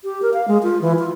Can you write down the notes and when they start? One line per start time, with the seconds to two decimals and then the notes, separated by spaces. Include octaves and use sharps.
0.04 G4
0.22 A#4
0.34 F5
0.48 G#3
0.63 F4
0.81 E3
0.99 F4